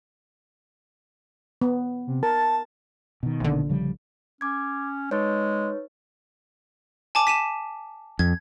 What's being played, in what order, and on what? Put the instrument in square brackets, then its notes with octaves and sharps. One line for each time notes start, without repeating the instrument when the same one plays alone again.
[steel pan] B3
[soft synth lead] C3
[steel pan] A#4 [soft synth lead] A5
[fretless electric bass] B2 D#3
[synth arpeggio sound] A#1 D3
[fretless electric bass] C#3 F3 G3
[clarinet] C#4 [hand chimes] D6 G#6
[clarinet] G#3 [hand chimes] D#4 B4 C#5
[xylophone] G#5 A5 D6
B6 D#7 E7
[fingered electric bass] F2 [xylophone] G#6